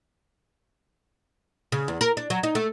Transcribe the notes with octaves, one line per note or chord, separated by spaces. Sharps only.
C#3
E2
A#4
D4
F#3
D#4
A3